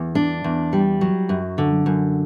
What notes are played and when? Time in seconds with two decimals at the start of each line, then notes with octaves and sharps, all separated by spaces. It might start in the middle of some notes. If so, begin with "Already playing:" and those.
Already playing: E2
0.15 D4
0.44 E2
0.73 G3
1.01 F#3
1.29 F#2
1.58 D3
1.86 F#2